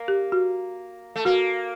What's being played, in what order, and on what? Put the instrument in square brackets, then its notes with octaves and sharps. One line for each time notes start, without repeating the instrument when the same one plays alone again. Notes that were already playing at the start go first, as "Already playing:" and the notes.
Already playing: [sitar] A#3
[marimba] G4
F#4
[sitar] A3
[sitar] A#3 [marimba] F#4